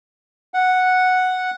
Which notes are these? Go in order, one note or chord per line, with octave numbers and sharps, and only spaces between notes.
F#5